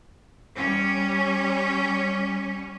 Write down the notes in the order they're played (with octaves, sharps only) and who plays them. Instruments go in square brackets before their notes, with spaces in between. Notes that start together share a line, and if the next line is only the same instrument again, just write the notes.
[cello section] G3 C#4